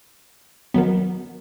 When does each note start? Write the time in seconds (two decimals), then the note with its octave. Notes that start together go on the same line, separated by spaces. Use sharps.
0.74 D#3 F#3 B3